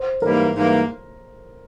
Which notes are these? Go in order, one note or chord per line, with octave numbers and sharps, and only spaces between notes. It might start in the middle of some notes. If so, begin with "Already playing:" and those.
Already playing: C5
G#2 E3 G3 A#3 A#4
G#2 E3 G3 A#3